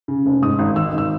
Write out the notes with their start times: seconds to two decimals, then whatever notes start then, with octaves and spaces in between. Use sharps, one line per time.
0.08 C#3
0.26 F1
0.42 G#2 D#6
0.59 G#1
0.76 D#3 E6
0.93 G#1 E6